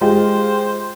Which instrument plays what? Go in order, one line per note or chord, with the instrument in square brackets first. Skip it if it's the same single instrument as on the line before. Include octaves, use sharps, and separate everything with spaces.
[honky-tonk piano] G#3 F4 G4 [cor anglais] C5